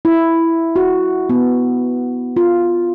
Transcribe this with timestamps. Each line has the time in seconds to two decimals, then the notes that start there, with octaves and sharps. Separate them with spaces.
0.05 E4
0.76 F#4
1.30 B3
2.37 F4